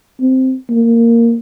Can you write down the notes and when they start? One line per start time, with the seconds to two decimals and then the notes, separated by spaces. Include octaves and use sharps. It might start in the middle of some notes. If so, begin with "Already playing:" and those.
0.21 C4
0.70 A#3